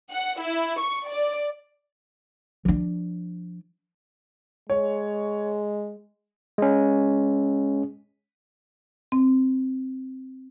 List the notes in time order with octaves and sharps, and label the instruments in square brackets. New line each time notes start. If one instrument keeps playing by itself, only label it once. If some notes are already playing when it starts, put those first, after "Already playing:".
[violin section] F#5
E4
C#6
D5
[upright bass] F3 D4
[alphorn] G#3 [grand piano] C#5
[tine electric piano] G#3 C#4
[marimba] C4